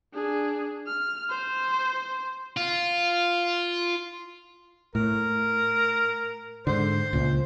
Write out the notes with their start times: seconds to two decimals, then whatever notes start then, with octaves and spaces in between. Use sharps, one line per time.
0.14 D4 G#4
0.87 F6
1.30 C5
2.57 F4
4.95 A2 A#4
6.67 G#2 D3 C5
7.13 C#2 A#2